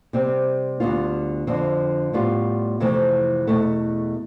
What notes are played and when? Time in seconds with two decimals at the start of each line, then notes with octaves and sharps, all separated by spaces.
0.13 C3 G3 C4
0.80 D2 D3 G3 B3 F4
1.47 F2 D3 F3 C4
2.13 A2 G3 B3 F4
2.80 F2 C3 E3 A3 C4
3.47 E2 B2 A3